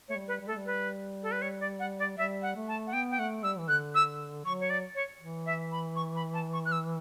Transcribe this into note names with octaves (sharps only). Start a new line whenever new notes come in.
A3 C#5
G3
B4
G3
A3 A4
G3
B4
A4
B4
C#5
D5
F#5
D5
G3 E5
F#5
A3
A5
F#5
B3 G5
G5
A3 F#5
G3 E6
E3
D3 F#6
E6
F#3 C#6
C#5
D5
C#5
E3
E5
B5
C#6
B5
A5
C#6
F#6
E6